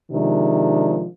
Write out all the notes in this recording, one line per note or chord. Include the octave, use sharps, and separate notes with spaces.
C3 D#3 F3 G#3 D4